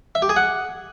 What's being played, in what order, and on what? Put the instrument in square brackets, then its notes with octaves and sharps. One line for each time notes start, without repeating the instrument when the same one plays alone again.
[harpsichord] E5
G4
G#4
F#5